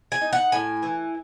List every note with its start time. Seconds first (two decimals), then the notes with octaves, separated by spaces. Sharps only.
0.12 G#5
0.21 D#4
0.33 F#5
0.52 A2 G#5
0.83 E3